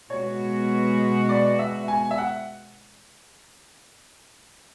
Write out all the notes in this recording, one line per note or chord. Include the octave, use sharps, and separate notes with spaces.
B2 G#3 B3 F#4 C#5
D5
E5
G#5
E5
F#5